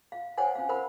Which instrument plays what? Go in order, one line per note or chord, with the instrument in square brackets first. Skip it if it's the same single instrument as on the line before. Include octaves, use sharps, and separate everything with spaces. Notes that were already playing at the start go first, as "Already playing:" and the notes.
[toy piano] F5
C5 C#5 F#5 G#5
C#4 F5
A#4 C5 F#5 B5